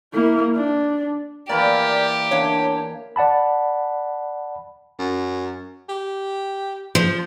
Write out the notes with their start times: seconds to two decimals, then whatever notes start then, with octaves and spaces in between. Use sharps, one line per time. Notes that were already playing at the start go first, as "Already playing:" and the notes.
0.14 A#3 E4
0.56 D4
1.49 E3 A#3 G4 D5
2.31 E2 D4 C#5 F5
3.16 D5 F#5 A5 B5
4.99 F#2
5.89 G4
6.95 F3